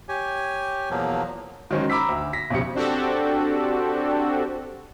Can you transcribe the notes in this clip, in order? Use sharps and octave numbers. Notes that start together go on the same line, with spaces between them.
G4 C#5 G#5
E2 B2 F3 F#3 A#3
D#3 F#3 G#3 C#4 C5
A#5 B5 D6 E6 B6
D2
A#6 B6
B1 F2 C#3 G4 C#7
C4 D4 F#4 G4 A4